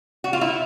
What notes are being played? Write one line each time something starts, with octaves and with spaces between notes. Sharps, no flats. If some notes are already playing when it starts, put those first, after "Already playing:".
F#4
F4
E4